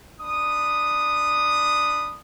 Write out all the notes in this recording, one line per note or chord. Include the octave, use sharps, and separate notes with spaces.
D4 B5 D#6